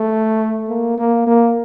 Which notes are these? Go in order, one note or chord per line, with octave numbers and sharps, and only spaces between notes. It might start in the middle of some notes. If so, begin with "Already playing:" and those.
Already playing: A3
A#3
A#3
A#3